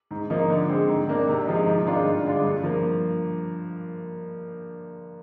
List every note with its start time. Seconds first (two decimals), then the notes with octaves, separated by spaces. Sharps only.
0.11 G#2
0.30 F3 A#3 D#4
0.50 D3
0.69 G#3 C4
0.89 G#2
1.08 D#3 A#3 D4
1.27 C3
1.47 F3 G#3 D#4
1.66 G#2
1.86 D#3 G#3 D4 F4
2.05 G2
2.24 D3 G#3 D4 F4
2.44 G2
2.63 F3 A#3